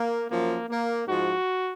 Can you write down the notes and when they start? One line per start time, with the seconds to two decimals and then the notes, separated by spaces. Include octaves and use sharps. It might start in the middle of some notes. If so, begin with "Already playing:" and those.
Already playing: A#3
0.30 F#2 F3 A#3
0.69 A#3
1.08 G#2 F3 F#4